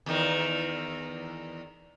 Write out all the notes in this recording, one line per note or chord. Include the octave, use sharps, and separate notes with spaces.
E2 D#3